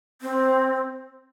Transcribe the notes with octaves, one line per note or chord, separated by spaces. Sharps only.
C4